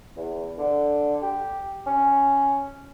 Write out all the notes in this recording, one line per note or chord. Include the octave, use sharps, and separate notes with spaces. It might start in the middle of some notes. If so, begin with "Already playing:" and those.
E2
D3
G4
C#4